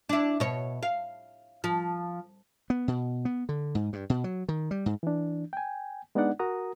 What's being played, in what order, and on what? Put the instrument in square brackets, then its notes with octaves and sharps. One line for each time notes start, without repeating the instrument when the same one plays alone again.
[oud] D4 E4
B2 C#5
F5
F3
[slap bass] B3
B2
B3
D3
G#2
G2
B2
F#3
D#3
G3
G#2
[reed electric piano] E3 D4
G5 G#5
G#3 B3 D4 D#4 D5 F#5
F#4 A#4 A#5 D#6